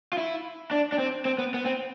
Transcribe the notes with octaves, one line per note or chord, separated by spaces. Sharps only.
F4
E4
D4
D4
C4
C4
B3
B3
C4